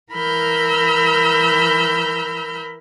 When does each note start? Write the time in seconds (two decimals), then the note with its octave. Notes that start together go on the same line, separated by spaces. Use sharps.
0.13 E3 A#4 B5 E6 F6 G6